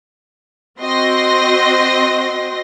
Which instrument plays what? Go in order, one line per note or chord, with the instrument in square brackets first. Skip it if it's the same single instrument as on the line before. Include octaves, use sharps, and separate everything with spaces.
[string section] C4 F#4 D#5 C6 A#6